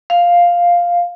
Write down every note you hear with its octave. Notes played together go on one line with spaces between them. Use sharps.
F5